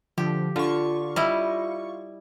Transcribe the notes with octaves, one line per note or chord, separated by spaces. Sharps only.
D3 F3 G4
D3 F4 C#6
G3 E4 D#5